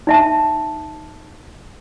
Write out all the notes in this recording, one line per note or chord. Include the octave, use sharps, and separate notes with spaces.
D#4 E5 A5